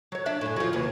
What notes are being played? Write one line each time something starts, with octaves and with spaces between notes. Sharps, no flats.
F#3 C#5
D4 D5 E5
F#2 A2
F3 F#3
D#2 C3 E3